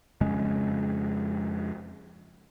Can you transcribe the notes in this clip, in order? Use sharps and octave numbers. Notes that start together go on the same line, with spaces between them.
F2 C#3 G#3 C#4